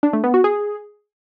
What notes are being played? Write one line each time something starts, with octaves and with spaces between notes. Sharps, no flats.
D4
A3
B3
F#4
G#4